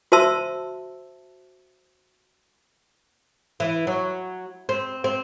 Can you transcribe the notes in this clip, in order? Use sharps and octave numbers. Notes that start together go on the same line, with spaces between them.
F#4 C5 E5 A5 C6 E6
E3
F#3
C4
C4